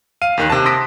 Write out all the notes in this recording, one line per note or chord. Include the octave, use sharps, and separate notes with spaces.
F5 D#7
D#2 D#3 F#6
C3 A5
C6 D#6 A#6 B6 D7